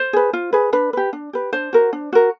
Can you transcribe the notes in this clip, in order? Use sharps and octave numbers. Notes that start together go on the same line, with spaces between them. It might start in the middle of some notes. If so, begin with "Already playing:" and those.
Already playing: C5
G#4 B4
F4
G#4 B4
D4 B4
G4 B4
D4
G4 B4
D4 C5
F#4 A#4
D4
F#4 A#4